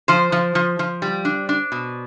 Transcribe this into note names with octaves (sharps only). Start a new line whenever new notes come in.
F3 C5
F3
F3
F3
G3
D4
D4
B2